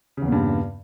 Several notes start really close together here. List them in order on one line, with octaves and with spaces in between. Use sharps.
C#3 E2 A#2 G2